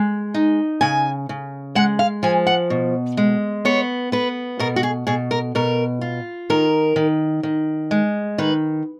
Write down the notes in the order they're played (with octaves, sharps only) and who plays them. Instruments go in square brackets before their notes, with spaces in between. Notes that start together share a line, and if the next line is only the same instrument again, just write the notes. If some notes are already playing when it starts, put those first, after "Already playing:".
Already playing: [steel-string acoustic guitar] G#3
D#4
C#3 G#5
C#3
G#3 F#5
F5
F3 G#5
F#5
B2
G#3
B3 C#5
B3 B4
B2 A#4
F#4
G#4
B2 G#4
A#4
B2 A#4
F4
D#3 A#4
D#3
D#3
G#3
D#3 B4